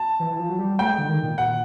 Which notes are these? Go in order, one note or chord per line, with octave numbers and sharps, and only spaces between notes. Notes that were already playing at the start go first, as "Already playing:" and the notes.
Already playing: A5
E3
E3
F3
F#3
G3
G3
A3 G5
G#3
D3
D#3
A#2
F#5